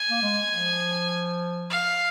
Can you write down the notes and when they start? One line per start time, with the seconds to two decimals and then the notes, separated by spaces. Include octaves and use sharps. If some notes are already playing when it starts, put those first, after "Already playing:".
Already playing: G#5
0.10 A#3
0.22 G#3
0.52 F3
1.70 F5